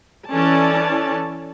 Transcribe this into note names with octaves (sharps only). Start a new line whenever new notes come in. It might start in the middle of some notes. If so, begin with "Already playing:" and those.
E3 C#4 A4 D5 A5